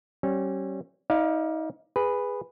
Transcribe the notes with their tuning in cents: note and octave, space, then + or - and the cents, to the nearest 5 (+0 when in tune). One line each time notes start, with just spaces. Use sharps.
G3 -35 C#4 -30
D#4 +35 D5 +15 F5 +0
G#4 -15 B4 +0